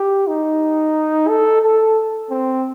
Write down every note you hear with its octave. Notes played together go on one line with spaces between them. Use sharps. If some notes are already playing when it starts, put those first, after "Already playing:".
Already playing: G4
D#4
A4
A4
C4